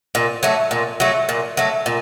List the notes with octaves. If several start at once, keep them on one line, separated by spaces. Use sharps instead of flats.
A#2
F#3 A3
A#2
F#3 A3
A#2
F#3 A3
A#2